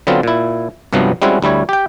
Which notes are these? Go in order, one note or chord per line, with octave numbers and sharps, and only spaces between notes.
D3 F#3 B3 C4 F4
A#2 E4
C2 G2 C3 F3 F#3 B3
G3 G#3 C4 C#4 E4 F#4
D2 G3 E4 C#5
G4 G5